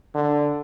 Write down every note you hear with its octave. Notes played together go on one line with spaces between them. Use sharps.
D3